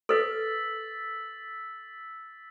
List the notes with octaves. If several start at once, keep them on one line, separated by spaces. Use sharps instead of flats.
A4 B4 E6 A6 B6